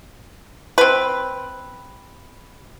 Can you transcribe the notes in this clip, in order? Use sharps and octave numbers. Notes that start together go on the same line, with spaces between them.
C4 B4